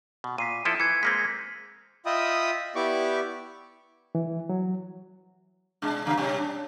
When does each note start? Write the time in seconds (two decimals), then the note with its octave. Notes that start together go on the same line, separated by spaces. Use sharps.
0.24 B2
0.38 A#2 B6 C7 D#7
0.65 F3 E4 A4
0.80 E3 G#6 C7 C#7
1.03 G#3 A#3 C4 B6
2.06 F4 D#5 E5 G5 B5 D#6
2.75 B3 E4 G4 D5 C#6 D6
4.15 E3
4.49 F#3
5.82 B2 G#3 D4
6.05 C#3 G3 A#3
6.17 B2 G3 C#4
6.38 D4